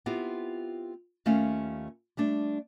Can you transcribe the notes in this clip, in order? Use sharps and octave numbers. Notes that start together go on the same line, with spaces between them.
B3 C4 E4 F4 G4
D#2 A3 C#4 F4 F5
G3 A3 D4